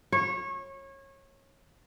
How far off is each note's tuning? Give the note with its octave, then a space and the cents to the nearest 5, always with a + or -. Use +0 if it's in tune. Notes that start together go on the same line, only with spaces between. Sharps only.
C#5 -25